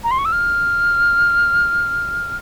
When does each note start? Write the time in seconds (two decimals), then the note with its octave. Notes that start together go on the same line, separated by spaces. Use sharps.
0.04 A#5
0.11 C6
0.18 C#6
0.25 E6
0.32 F6